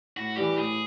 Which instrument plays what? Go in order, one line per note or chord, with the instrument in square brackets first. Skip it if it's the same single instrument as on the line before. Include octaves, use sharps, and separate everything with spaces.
[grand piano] A2 [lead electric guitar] F#4
[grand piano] E3 G3 [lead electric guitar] G4
[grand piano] A2 [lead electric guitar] G#4